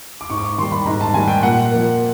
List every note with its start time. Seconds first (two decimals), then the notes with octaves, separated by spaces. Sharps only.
0.21 D6
0.30 G#2 C#6
0.38 D6
0.44 C#6
0.58 D#3 C6
0.63 G3
0.72 B5
0.86 G#2 A#5
1.01 A5
1.14 D#3 G3 G#5
1.28 G5
1.43 A#2 F#5
1.71 F3 A#3